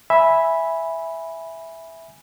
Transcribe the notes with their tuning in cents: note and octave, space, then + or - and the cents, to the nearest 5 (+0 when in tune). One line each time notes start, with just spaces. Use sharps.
E5 +0 G#5 -5 B5 -5